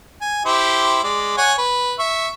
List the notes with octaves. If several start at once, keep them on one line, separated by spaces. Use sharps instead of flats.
G#5
E4 G4 C5
G#3 D5
C#5 F#5 G#5
B4
E5 C#6